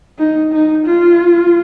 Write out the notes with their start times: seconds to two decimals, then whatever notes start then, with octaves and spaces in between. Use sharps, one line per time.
0.19 D#4
0.52 D#4
0.86 F4